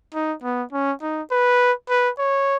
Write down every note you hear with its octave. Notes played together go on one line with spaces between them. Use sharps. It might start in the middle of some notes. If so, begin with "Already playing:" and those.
D#4
B3
C#4
D#4
B4
B4
C#5